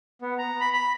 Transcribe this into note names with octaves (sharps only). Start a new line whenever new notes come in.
B3
A#5
B5
B5